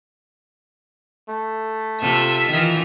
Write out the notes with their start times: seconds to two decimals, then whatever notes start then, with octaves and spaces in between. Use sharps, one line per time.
1.29 A3
2.01 C3 F4 A4 E5
2.50 D#3 E3 F4